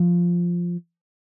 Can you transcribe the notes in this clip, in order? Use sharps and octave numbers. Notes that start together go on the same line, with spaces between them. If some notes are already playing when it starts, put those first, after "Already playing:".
Already playing: F3